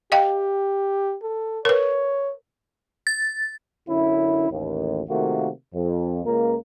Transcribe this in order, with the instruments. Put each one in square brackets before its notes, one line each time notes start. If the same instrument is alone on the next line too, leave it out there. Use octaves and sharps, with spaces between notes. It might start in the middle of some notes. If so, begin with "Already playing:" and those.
[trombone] G4 [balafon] D#5 F5 G5
[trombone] A4
[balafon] A#4 B4 [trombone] C#5
[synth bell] A6
[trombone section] F#2 D3 C#4 E4
A1 D#2
C3 D#3 A3 A#3 F4 F#4
F2
C#2 A#3 A#4